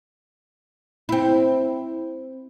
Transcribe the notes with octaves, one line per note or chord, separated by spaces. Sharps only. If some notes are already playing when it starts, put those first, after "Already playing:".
C4 E4